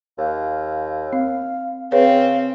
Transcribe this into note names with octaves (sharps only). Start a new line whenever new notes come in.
D#2 F5
C4 F5
C#3 C4 G#4 B4 C#5 F5